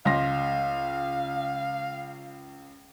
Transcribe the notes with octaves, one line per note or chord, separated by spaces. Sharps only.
C#2 F5 C6 A#6